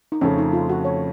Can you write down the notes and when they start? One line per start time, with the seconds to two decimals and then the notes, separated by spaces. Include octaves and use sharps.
0.12 D#4
0.21 F2 C#3 A3 C#4
0.38 D#4
0.53 F4
0.69 F#4
0.85 C#5